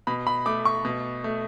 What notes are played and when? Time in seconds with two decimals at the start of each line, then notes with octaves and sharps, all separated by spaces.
0.07 B2 B5
0.27 B5
0.46 A3 D6
0.65 C#6
0.85 B2
1.24 A3